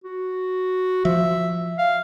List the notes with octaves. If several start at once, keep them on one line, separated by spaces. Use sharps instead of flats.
F#4
F3 E5
F5